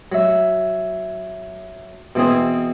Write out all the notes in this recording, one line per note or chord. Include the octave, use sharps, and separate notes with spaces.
F#3 E5
B2 E3 C4 G#4